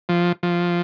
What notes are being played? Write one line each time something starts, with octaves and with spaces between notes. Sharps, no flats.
F3
F3